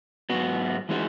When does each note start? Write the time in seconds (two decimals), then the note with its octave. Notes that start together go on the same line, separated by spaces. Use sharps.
0.30 G#2 F#3 B3 F#4
0.89 E3 G#3 D#4 F#4